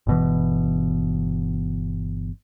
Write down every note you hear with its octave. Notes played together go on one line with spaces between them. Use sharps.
G1 B2 E3